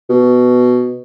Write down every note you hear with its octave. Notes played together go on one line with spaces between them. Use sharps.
B2